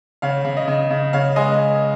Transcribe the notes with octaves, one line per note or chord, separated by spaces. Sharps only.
C#3 C#5 F5
C#3
D#5
C#3
C#3
C#3 C#5 F5
G#3 D#5 G#5